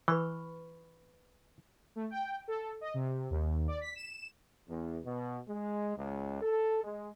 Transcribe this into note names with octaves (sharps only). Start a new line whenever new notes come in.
E3 B4 B5 C#6
A3
G5
A4
D#5
C3
D#2
D5
B6
E7
E2
B2
G#3
C#2
A4
G#3